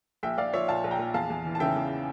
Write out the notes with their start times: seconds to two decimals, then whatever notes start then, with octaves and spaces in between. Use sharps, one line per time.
0.23 A#1 E5 G5
0.38 A#1 D5 F5
0.54 F3 C#5 E5
0.68 A#2 F5 A5
0.84 A#1
0.91 G5 A#5
0.99 A#1
1.14 E2 F5 A5
1.30 E2
1.45 E3
1.55 A5
1.60 C#3 E5 G5
1.76 E2